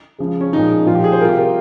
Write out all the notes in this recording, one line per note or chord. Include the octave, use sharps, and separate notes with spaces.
C#3 F3 G#3
C#4
A#2 F3 G#3 D#4
A#2 F3 G#3 F4
G4
G#4
C5
C3 G3 F4 G4 A#4
A#4